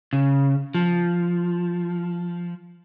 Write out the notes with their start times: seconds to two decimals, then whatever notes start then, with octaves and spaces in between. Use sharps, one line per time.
0.13 C#3
0.75 F3